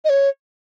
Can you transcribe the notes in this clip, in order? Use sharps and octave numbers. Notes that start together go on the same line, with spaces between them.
D#5
C#5